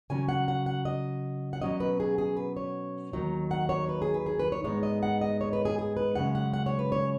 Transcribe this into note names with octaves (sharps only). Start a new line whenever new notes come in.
C#3 F#3 C#4 G#5
F#5
F#5
F#5
D#5
F#5
B2 F#3 C#4 D#5
B4
G#4
G#4
B4
C#5
D#2 D#3 F#3 D#4
F#5
C#5
B4
G#4
B4
G#4
B4
C#5
G#2 G#3 B3 D#4 C#5
D#5
F#5
D#5
C#5
B4
G#4
G#4
B4
F#2 C#3 G#3 C#4 F#5
F#5
F#5
C#5
B4
C#5